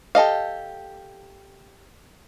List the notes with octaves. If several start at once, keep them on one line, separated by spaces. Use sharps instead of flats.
G4 A4 D#5 F5